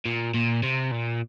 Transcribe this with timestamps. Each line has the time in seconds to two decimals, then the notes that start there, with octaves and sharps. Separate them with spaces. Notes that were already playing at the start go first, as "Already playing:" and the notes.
0.06 A#2
0.34 A#2
0.63 C3
0.92 A#2